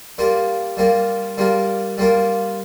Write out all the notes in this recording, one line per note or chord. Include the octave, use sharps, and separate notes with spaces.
G3 A#3 F4 A#4
G3 A#3 F4 A#4
G3 A#3 F4 A#4
G3 A#3 F4 A#4